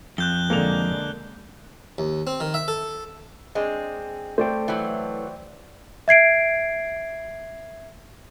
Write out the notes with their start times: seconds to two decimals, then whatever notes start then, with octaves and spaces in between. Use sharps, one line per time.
0.18 F2 F#6 G6 G7
0.50 D3 G#3 A#3 A4 F7
1.98 D#2
2.27 C4
2.40 D#3
2.54 E5
2.68 A4
3.55 G#3 C4 D4
4.38 A3 C5 D5 G5
4.68 E3 F#3
6.08 E5 G#6 C7 D7